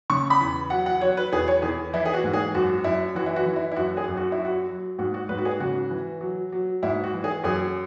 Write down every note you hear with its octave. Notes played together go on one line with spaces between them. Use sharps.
C#3 C#6
B5
E2
F#3 F#5
F#5
F#3 C#5
B4
E2 G#4
C#5
E2 G#4
E3 E4
G#4
F#4
G#2
G#4
F#2 F#4
F#2 E4
E3 F#4
E4
F#4
E3
E4
E4
F#2 F#4
G#4
F#2
F#4
E4
F#3
F#4
F#3
G#2 F#4
F#4
G#2 B4
F#4
G#4
C#3 F#4
E3
F#3
F#3
G#2 E4
F#4
E3
G#4
F#2 G#4